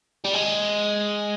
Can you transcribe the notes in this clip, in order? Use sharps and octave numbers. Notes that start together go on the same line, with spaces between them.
G3
G#3